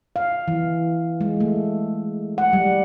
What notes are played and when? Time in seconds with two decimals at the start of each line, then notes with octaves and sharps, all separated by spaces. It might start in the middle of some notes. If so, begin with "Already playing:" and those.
0.16 F5
0.48 E3
1.21 G#3
1.40 A3
2.38 F#5
2.53 G3